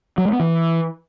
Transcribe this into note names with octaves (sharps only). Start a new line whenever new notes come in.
F#3
G#3
B3
E3